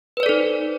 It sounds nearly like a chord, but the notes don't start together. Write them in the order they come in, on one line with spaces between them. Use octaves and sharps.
B4 C5 D5 A4 D#4